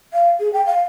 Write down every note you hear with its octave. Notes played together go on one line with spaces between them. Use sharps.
F5
G#4
G5
F5